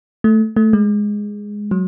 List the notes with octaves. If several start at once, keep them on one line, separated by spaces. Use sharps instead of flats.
A3
A3
G#3
F#3